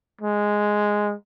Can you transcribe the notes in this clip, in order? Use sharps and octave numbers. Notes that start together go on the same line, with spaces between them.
G#3